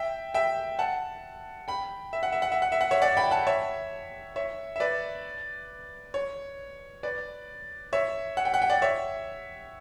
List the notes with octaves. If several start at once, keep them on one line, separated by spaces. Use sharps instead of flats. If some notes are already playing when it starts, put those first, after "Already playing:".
Already playing: E5 G5
E5 G5
F#5 A5
G5 B5
E5
F#5
E5
F#5
E5
F#5
E5
F#5
C#5 E5
D5 F#5
G5 B5
F#5 A5
C#5 E5
C#5 E5
E5
B4 D5
C#5
B4 D5
C#5 E5
F#5
G5
F#5
G5
D5 F#5
C#5 E5